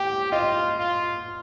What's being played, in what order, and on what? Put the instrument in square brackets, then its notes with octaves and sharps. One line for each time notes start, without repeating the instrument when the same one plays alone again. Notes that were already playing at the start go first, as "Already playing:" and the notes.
Already playing: [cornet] G4 [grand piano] G5
[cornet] F4 [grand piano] D#5
[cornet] F4